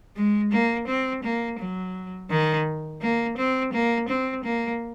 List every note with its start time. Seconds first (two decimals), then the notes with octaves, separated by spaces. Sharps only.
0.16 G#3
0.52 A#3
0.87 C4
1.23 A#3
1.59 F#3
2.30 D#3
3.01 A#3
3.37 C4
3.73 A#3
4.08 C4
4.44 A#3